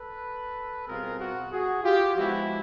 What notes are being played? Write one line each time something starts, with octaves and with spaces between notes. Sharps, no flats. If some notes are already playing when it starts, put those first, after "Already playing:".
Already playing: A4 B4
B2 G3 C4 F4 G#4 A#4
F#4
F#4 G#4
F4 G4
F3 G#3 B3 E4 F#4